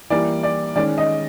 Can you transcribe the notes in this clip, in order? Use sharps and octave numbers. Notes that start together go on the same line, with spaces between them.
E3 G3 A#3 D5
D5
D#3 G#3 C#4 D5
D#5